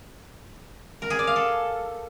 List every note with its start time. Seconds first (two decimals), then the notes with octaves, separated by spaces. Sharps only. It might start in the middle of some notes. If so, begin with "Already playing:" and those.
1.02 A#4
1.10 G#4
1.19 D5
1.27 F5
1.36 A4